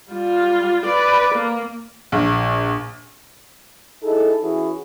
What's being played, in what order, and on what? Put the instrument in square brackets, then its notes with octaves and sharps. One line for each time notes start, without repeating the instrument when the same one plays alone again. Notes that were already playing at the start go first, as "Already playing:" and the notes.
[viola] G3 F4
B4 D5
A#3
[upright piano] A#1
[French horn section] D#4 E4 G#4 A4
E3 C#4 E4 F#4 G#4